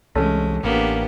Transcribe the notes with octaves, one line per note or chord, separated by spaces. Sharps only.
C2 E3 G#3 A3 C#4
A1 A#3 B3 D4 G4